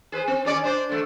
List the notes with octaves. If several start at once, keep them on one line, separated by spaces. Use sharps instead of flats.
G#4 B4 C5
C4
D#2 C#4 D5
D4 C5 D5
D3 A3